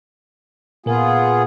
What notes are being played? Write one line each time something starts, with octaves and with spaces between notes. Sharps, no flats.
A#2 B3 F4 G#4 A#4